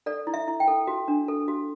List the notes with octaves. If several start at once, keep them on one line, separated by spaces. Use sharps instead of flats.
A4 D5
E4
E5
E4
G5
A4
F#4
D4
A4
F#4